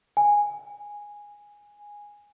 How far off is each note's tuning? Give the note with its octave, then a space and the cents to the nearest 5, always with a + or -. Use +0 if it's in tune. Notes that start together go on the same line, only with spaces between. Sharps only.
G#5 -10